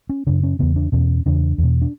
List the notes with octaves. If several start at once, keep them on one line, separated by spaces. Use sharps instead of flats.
C#4
F#2 C#3 D4
C#4
E2 C#3 B3
D4
E2 B2 C#4
E2 C#3 D4
E2 B2
D4